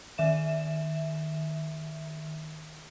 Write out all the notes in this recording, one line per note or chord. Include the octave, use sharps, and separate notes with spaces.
D#3 E5 E7